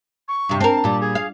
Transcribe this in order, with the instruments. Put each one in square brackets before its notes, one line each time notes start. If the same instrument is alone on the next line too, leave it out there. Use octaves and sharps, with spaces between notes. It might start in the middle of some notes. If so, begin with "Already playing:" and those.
[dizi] C#6
[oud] G2 C3
[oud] C4 A#4 [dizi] A5
[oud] A#2 G3
[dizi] G#4
[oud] F5